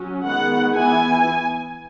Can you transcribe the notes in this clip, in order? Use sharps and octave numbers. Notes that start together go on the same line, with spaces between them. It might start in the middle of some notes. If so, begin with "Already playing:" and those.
Already playing: F#3 C#4
D#3 G#3 B3 F#5
E3 B3 G#5